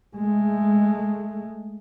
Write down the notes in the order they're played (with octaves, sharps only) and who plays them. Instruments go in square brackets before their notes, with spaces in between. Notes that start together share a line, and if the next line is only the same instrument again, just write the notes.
[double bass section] G#3 A3